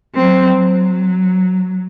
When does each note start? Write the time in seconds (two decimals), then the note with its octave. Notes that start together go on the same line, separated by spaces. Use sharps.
0.15 F#3 C4
0.55 F#3